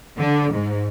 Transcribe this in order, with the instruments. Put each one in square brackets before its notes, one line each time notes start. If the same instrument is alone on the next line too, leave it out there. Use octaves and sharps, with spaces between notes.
[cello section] D3
G#2